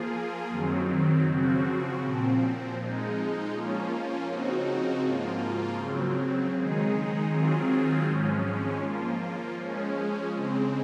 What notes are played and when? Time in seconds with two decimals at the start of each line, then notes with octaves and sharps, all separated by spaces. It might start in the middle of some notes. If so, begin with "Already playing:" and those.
Already playing: F3 A#3 F4 G#4
0.48 F#2 D#3 F#3 C4
1.24 C#3 F3 C4 F#4
1.99 A#2 F3 C4
2.76 F3 G#3 D#4
3.51 F3 A#3 C#4 F4
4.26 C#3 F3 C4 D#4 F#4
5.02 G#2 F3 A#3 F4
5.78 C#3 F#3 C4
6.53 D#3 G#3 D#4 G#4
7.29 D#3 F#3 C4 F4 G#4
8.03 G#2 F3 G#3 C#4
8.79 F3 A#3 F4
9.55 F3 G#3 C#4
10.31 C#3 G#3 C4